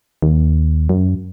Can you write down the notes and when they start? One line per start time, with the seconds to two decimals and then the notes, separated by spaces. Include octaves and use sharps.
0.22 D#2
0.89 F#2